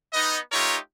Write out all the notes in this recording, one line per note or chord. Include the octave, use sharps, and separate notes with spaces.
B3 D#4 D#5
A3 D#4 F4 G4 A#4 C#5